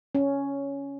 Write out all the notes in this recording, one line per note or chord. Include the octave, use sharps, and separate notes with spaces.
C#4